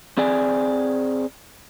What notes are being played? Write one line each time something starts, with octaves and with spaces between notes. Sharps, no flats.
C4 G#4 D5 G#5